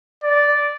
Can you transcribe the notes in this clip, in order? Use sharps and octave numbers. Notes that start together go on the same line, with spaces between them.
D5